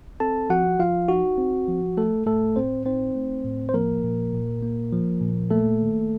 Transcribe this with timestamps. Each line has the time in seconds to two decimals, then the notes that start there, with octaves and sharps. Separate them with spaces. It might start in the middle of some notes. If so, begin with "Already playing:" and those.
0.20 C4 A4 A5
0.50 F3 F#4 F#5
0.79 F3 F4 F5
1.08 D#4 F#4
1.38 C4
1.68 F3
1.97 A3 A4
2.26 A2 A3 A4
2.56 A2 C4 C5
2.85 C4 D#4 C5
3.16 A3
3.45 A2
3.69 C5
3.74 F3 A#3 A#4
4.03 A#2
4.33 A#2
4.63 A#3
4.92 F3
5.21 A#2
5.51 A3 A#3 A4
5.81 D#3